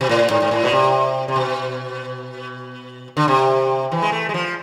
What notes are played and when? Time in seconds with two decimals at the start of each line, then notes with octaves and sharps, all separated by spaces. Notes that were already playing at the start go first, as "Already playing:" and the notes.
0.01 B2
0.09 A2
0.30 G#2
0.42 G#2
0.51 A2
0.64 B2
0.72 C3
1.28 C3
1.36 B2
3.17 D3
3.28 C3
3.92 E3
4.02 G#3
4.12 A3
4.29 G#3
4.34 F3